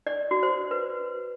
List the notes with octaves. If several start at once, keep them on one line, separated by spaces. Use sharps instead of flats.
D5
F#4
C5
B4